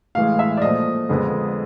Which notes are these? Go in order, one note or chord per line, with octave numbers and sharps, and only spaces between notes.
A2 E3 G#3 F5
E5
D5
A#2 F3 A3 D#5
F2 D3 F3 G#3 B3